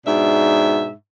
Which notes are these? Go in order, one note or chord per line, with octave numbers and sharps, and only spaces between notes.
G#2 B2 D4 E5